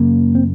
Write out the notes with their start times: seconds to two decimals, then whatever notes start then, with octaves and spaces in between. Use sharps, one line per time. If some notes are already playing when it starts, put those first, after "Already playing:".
Already playing: F#2 C#3 A#3
0.35 C4